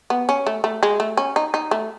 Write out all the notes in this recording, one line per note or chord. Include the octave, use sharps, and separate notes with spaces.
B3
C#4
A3
A3
G#3
A3
C#4
D#4
D#4
A3